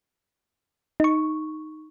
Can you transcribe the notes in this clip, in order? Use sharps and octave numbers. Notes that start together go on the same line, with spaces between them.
D#4 C#6